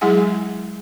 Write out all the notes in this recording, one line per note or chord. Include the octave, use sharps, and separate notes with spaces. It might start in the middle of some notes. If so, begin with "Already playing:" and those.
F#3 G#3 E4 G#4 F#5 G#5